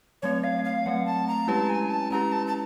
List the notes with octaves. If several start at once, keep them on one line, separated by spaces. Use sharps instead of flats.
F#3 A3 C4 C#5
F5
F5
F#3 A3 C4 F#5
A5
A#5
G#3 C#4 E4 G4 B4 A5
G#5
A5
G#3 C#4 E4 G4 B4 A#5
A5
A5